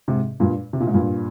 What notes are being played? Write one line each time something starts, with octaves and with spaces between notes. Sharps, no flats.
G#2 C3
G2 A#2
C3
A#2
G#2
G2 A#2